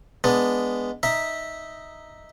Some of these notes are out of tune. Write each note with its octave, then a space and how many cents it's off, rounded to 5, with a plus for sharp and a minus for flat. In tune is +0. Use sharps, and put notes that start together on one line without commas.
G#3 -5 B3 +0 D4 +0
D#4 +0 E5 -10 A#5 +0